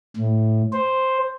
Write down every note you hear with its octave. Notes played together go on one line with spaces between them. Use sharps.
A2
C5